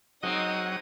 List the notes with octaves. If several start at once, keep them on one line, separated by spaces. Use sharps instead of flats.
F#3 G#3 C4 D#4 D#5 F#5 D#6